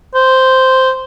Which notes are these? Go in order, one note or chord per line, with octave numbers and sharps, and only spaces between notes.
C5